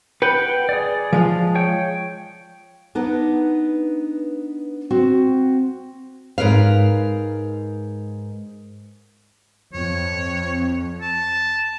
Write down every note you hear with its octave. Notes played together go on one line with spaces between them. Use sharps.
B4 F#5 G5 B5
G#4 D5
F3 G#3 F4
C#5 G5
B3 D4 D#4 B4 F#5
C4 F#4
G#2 A#4 B4 F5
F2 C#5
A5